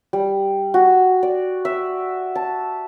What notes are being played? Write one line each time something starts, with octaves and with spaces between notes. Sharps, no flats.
G3
F#4
D5
E5
A5